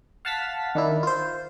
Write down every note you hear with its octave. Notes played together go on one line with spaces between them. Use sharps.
F5 F#5 A5 F6 A6 B6
D#3 D4 E4
F4 C5